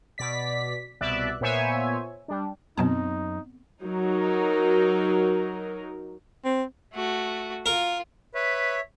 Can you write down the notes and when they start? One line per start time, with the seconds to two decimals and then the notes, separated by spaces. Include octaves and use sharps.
0.18 B2 D5 B6
1.01 C2 B2 D5 E5 F#6
1.41 A#2 B3 C5 C#5 E5 G#5
2.28 G3 D4
2.78 F#2 B2 F#3 B3 C4 D#4 A5
3.83 F#3 D#4 A#4
6.45 C4
6.94 A3 F#4
7.66 F4 A#4
8.35 B4 C#5 E5